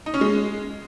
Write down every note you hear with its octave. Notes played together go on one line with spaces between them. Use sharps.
D#4
C#4
G#3